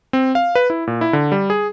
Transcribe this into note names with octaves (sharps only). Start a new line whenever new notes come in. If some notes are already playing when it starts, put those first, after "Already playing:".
C4
F5
B4
E4
A#2
E4
D3
G3
G#4